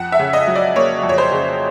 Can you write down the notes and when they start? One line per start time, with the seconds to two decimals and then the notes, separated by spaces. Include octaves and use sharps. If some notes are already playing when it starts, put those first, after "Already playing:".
Already playing: F2 F#5
0.12 E5
0.19 C#3
0.33 D#5
0.47 F#3
0.55 D5
0.76 A#3 C#5
1.03 F2
1.09 C#5
1.18 C5
1.31 C#3